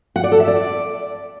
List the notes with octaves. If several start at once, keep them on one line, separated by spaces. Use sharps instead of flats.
F#5
D5
A4
E5
D5